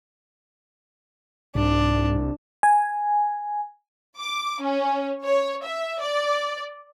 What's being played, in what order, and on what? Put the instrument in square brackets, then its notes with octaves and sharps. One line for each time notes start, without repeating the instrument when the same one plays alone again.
[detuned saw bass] C2 [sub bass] G#2 [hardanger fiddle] D4
[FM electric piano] G#5
[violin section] D6
C#4
C#5
E5
D5